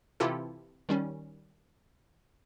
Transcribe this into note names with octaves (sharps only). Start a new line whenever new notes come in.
C3 E3 E4 F4 G4 A4
D#3 G3 C#4